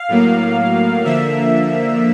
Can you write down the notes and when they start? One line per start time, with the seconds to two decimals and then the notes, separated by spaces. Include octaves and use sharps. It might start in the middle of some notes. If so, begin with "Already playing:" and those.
Already playing: F5
0.08 A2 F#3 A#3
1.04 D3 F3 A#3 E5